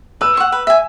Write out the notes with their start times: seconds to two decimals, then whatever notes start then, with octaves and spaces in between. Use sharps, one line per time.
0.21 B4 E6
0.37 F#5 C#6
0.52 B4
0.67 E5 G#5